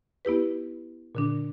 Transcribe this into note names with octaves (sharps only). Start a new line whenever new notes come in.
B3 E4 G4 B4
A#2 D3 D4